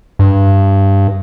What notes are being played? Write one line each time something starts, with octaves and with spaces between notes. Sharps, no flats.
G2